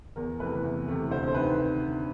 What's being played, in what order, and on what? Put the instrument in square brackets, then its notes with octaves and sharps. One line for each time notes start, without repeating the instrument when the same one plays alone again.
[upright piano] E2 A#4
C3 E3 A3 B4
E2
C3 E3 A3
D2 C5
C5
C3 D#3 B4